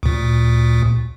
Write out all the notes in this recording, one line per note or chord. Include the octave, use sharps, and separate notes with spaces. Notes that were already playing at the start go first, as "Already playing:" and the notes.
D2 A#2